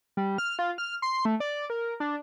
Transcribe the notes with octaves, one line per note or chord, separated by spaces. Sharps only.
G3
F6
F4
F6
C6
A3
D5
A#4
D4